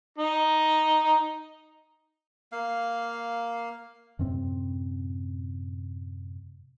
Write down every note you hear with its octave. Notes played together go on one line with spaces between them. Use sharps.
D#4
A#3 F5
F#2 A2 C3 C4